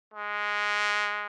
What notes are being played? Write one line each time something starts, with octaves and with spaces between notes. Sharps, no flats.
G#3